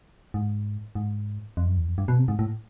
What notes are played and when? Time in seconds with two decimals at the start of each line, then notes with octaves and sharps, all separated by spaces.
0.34 G#2
0.95 G#2
1.57 F2
1.67 F#2
1.77 E2
1.87 F2
1.98 G2
2.08 B2
2.18 C3
2.28 G#2
2.39 A2